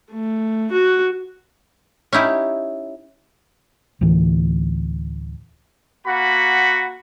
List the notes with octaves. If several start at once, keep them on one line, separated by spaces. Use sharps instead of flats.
A3
F#4
C#4 D#4 E4 G4
D2 A2 E3
A#3 F#4 F#5 B5